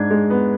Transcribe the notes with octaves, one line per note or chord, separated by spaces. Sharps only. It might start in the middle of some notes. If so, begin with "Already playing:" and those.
Already playing: G#2 G#3 D4 G#6
G#3
B3